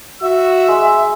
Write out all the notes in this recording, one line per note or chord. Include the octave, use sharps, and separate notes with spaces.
F#4 E5 E6
G#3